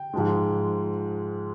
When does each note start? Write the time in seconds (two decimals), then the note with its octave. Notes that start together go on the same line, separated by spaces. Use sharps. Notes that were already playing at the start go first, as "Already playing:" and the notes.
Already playing: G5
0.14 G#2 F3 G#3